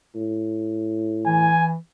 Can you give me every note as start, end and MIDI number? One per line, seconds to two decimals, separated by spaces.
0.16 1.53 45
1.27 1.75 52
1.27 1.67 80